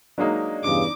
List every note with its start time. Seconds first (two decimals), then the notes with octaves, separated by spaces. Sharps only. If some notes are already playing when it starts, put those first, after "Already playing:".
0.18 F#3 G#3 A#3 D4 D#4
0.63 E2 G2 C#3 D6